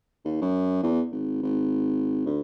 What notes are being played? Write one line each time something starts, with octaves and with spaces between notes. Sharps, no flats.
D#2
F#2
E2
G#1
G#1
D2